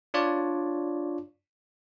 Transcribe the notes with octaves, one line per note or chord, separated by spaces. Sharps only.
D4 F4 C#5 D5